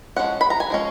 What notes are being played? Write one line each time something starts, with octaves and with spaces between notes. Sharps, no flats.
F3 G#3 C#4 F#5
B5
A#5
G#5
F3 G#3 C#4